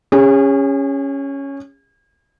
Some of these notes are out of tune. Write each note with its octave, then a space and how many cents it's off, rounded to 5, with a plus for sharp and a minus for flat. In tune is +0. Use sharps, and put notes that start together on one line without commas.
C#4 +0 G#4 -40